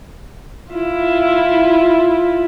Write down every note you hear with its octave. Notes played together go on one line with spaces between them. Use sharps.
E4 F4